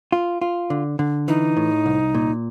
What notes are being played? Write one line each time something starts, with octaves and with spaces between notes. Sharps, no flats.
F4
F4
D3
D3
E3 D#4
A2
C2
A#2